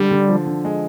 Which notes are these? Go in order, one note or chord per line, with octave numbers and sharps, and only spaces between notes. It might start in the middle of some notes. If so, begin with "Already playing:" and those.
Already playing: D3 G3
D3
F3
D3
G#3